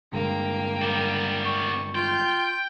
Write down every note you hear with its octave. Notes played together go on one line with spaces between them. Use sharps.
G2 D3 G#3 A#3 G5
G3 B3
C#6
F4 G5 G6